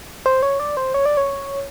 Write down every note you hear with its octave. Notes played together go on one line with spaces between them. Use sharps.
C5
C#5
D5
C5
C#5
D5
C#5